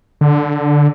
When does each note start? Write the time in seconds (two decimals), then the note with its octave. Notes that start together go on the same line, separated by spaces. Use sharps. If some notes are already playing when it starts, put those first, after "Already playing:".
0.21 D3